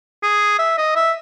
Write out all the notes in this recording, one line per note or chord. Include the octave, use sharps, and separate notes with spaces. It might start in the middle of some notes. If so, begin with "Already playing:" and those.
G#4
E5
D#5
E5